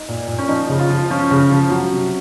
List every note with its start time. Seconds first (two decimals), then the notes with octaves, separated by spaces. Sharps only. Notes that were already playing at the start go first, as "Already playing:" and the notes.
Already playing: D#4
0.08 A#2
0.28 A#2
0.39 C#4
0.48 F3 D#4
0.69 C#3
0.79 F4
0.90 F3
1.10 F3 C#4
1.31 C#3
1.51 F3
1.71 F#3
1.92 C3